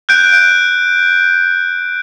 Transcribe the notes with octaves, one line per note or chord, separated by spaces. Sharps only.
F#6 G6 D7